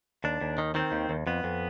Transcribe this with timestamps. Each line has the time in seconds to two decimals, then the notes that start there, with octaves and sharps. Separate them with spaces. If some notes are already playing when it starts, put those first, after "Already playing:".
0.24 D#2 D4
0.41 D#2
0.58 D#3
0.75 D#3 C4
0.92 D#2
1.10 D#2
1.27 F2 B3
1.44 F2